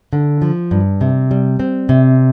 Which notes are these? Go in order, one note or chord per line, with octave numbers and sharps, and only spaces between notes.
D3
F3
G2
C3
G3
C4
C3